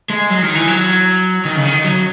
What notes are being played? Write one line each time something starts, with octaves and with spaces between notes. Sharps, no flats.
G#3
F#3
D#3
E3
F#3
D#3
C#3
D#3
F#3